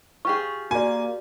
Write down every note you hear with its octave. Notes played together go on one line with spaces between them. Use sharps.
F4 G4 G#4 C#6
A#3 F#4 D5 G#5